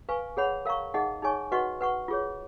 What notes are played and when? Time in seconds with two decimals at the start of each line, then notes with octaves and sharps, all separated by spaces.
0.09 B4 F5 G#5 C#6
0.37 G#4 C#5 F#5 B5
0.66 A#4 F5 A#5 C#6
0.94 D#4 G#4 D#5 F#5
1.22 D#4 G#4 C#5 G#5 C#6
1.52 F#4 B4 D#5 F#5 C#6
1.81 B4 F#5 C#6
2.08 F4 G#4 C#5